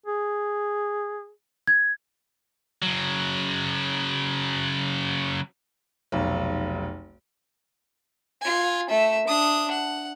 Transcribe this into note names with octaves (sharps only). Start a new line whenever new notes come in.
G#4
G#6
C#3 F#3
F1 B1
F4 G#5
A3 E5
D4 D#6
F#5